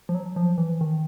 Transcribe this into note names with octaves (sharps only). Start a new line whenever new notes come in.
F3
F#3
F3
E3
D#3